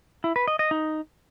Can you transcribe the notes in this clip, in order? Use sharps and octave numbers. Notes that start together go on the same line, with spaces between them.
E4
B4
D#5
D#5
D#4